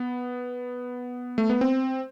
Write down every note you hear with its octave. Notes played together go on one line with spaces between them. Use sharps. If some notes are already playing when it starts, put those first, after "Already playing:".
Already playing: B3
A3
B3
C4